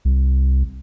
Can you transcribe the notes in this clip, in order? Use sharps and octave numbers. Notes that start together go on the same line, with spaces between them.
C2